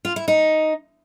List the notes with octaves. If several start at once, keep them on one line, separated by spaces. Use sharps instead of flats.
F4
E4
D#4